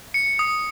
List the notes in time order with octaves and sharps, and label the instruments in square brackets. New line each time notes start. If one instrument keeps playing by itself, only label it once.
[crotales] C#7
D#6